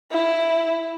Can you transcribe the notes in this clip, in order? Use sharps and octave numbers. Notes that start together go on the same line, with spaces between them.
E4